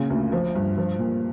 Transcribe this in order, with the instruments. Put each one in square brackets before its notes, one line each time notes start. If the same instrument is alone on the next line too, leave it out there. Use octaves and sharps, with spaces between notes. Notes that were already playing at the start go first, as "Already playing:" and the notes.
Already playing: [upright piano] A#2 C#3
D2
F3
G2
F3
A#2